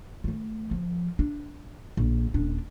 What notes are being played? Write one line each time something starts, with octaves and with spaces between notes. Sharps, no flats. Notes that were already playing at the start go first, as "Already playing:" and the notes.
D#3 A3
F3
D4
A#1
D#1 D4